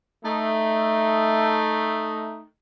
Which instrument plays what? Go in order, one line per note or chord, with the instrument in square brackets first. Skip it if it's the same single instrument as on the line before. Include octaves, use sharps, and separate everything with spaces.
[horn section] A3 D#4